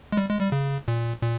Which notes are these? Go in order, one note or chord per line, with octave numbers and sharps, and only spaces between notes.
G#3
G3
G#3
G3
C#3
A#2
A#2